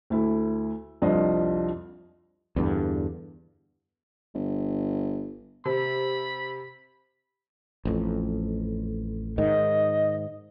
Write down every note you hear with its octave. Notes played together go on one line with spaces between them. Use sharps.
D2 E4 A4
C2 F2 D4 F4 D#5
E2 G2 D3
G1
C3 B5
A1 F2
G#2 D#3 D#5